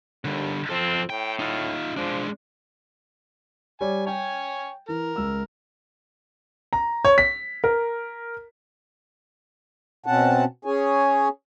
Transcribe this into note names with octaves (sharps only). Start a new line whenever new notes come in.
D#2 D3 G3
F3 C4 A4
A2 G5
D#4 F4
F3 G#3 D4
G3 C#5 D5 G#5
C#5 G5 G#5
E3 A#4
C#2 E6
A#5
C#5
B6
A#4
B2 C4 C#4 F#5 A5
C#4 G#4 C#5 G#5